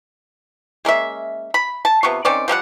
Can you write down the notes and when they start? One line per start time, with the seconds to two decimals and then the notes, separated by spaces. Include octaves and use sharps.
0.85 G#3 A#3 C#4 E5
1.54 B5
1.85 A5
2.03 C3 B3 F4 C#6
2.25 D#3 C4 C#4 D5
2.48 F3 G3 G4 F#5